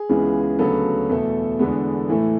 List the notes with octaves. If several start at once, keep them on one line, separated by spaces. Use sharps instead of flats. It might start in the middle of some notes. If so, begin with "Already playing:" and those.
Already playing: G#4
C#2 C#3 E3 G#3 B3
D2 C#3 F#3 B3 A4
E2 B2 A3
E2 D3 G#3 B3
A2 E3 A3